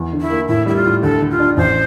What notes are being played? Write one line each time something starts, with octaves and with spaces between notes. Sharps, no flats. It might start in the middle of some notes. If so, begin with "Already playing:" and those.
Already playing: E2
D3
E4
A#3
A2 E4
G3 E4
F4
A2
D2 A4
D3
F4
D4
A1 C5